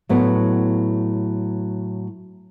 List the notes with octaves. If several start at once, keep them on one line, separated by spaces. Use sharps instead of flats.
A2 F#3 B3